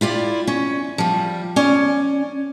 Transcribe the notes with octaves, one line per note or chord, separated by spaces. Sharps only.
E4 F4 G4 D5
C#4
F3 G3
C#4 D5